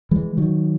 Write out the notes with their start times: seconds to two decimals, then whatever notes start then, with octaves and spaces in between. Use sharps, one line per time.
0.11 E3 G#3
0.37 D#3 F#3